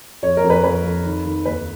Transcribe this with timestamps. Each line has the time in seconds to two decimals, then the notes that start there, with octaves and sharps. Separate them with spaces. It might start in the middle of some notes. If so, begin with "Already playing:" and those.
0.23 F2 C#5
0.37 A#4
0.44 F2
0.50 B4
0.64 F2 B4
0.84 F2
1.05 D#3
1.26 D#3
1.45 D#2 B4